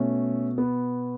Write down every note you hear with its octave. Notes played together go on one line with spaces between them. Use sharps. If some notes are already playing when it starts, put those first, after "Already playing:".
Already playing: B2 A3 C#4
B3